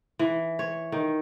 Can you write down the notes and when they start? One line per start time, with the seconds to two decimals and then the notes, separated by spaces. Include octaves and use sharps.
0.19 E3
0.59 C#5
0.92 D#3